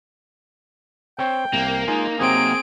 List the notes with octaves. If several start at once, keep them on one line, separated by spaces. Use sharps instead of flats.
C4 C5 C#5 G5
C2 A#3
G#3 D#4 F4 G#5
C3 F#3 C4 D#4 G#4 D7